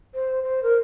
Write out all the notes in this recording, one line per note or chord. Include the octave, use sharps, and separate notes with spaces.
C5
C5
A#4